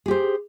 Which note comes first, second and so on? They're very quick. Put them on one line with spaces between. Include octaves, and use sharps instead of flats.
G#4 G4 C5